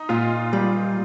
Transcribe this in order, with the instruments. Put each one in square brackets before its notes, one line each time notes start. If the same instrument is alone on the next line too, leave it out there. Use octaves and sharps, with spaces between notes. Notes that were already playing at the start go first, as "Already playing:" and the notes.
Already playing: [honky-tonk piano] D#4
[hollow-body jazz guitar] A#2 [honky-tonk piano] F4
[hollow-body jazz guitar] G3